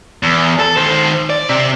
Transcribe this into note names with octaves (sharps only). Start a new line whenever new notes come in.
E2
A4
D#3 C5
D5
C3